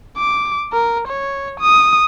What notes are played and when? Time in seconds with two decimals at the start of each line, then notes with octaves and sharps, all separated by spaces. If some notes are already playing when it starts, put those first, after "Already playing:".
0.17 D6
0.72 A#4
1.08 C#5
1.60 D#6